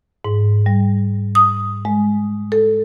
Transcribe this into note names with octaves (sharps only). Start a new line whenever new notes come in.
G#2
G3
D#6
G#3
A4